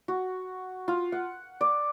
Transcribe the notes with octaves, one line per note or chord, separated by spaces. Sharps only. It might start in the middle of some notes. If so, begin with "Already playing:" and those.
F#4
F4
F#5
D5